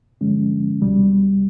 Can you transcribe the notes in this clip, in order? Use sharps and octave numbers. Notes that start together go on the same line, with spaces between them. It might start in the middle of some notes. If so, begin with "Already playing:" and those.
G2 D3 F3 G#3 C#4
C2 B2 G3